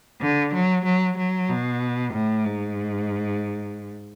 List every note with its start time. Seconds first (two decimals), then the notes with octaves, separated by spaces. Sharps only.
0.21 D3
0.53 F#3
0.85 F#3
1.17 F#3
1.49 B2
2.13 A2
2.45 G#2